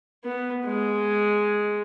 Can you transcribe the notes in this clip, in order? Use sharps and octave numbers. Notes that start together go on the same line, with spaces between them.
B3
G#3